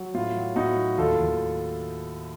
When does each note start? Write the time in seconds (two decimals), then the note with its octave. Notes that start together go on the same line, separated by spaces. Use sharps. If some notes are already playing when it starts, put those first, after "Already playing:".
Already playing: F#3
0.14 A2 F4
0.36 F#3
0.56 A2 D#4 F#4
0.77 F#3
0.98 D#2 F4 A4
1.19 D#2